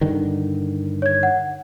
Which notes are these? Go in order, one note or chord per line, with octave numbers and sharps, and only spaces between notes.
G2 D3 D#3
C#5 G#6
F#5